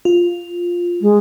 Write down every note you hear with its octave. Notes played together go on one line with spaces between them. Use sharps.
F4
G#3